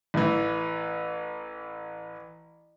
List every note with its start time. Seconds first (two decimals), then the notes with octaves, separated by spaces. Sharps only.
0.14 A1 E3